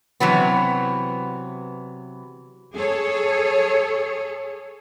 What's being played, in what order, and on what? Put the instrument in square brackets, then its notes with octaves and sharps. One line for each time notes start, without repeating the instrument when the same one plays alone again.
[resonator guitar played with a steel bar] C3 E3 F#3 B3
[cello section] G#4 A4 C#5